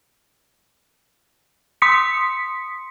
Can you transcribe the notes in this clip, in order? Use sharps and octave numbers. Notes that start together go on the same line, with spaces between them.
C6 D#6 B6 C#7